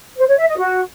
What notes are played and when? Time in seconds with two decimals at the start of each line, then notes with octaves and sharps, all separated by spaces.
0.17 C5
0.27 C#5
0.38 E5
0.48 D#5
0.58 F#4